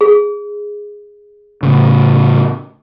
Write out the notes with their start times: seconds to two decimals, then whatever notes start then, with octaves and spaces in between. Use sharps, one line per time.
0.01 G#4
1.63 A2 C#3